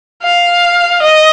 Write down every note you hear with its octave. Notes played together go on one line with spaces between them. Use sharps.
F5
D#5